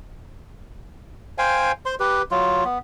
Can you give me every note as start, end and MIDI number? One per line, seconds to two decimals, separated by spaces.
1.38 1.72 72
1.38 1.72 77
1.38 1.72 79
1.38 1.72 80
1.86 1.95 72
1.86 1.95 84
2.00 2.22 67
2.00 2.22 71
2.31 2.64 54
2.31 2.64 65
2.65 2.78 59